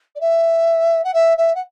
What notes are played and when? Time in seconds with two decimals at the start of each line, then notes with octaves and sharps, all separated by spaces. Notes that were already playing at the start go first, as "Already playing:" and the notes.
0.15 D5
0.20 E5
1.03 F#5
1.13 E5
1.37 E5
1.54 F#5